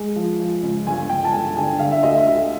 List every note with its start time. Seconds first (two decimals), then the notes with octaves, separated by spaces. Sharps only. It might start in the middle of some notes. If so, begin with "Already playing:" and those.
Already playing: G#3
0.16 F3
0.39 F3
0.63 C#2
0.87 G1 G#5
1.09 G1 G5
1.24 A5
1.32 G1 G#5
1.57 D3 G#5
1.79 D3 F5
1.91 E5
2.03 D2 D#5
2.15 E5
2.27 D2